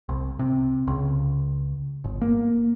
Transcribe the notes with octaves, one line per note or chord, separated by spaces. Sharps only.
C2
C3
C#2
G1
A#3